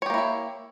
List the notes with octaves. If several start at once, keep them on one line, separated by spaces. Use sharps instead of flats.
A#3 E4 G4 C#5 E5